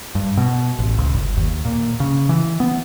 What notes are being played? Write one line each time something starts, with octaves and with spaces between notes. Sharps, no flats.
G2
B2
A1
C#2
G1
D#2
A#2
C#3
E3
B3